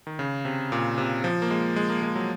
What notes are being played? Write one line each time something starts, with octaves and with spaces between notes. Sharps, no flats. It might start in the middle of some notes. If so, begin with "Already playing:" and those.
D#3
C#3
C3
A#2
C3
F3
A#3
G#3
G#3
A#3
G#3
F#3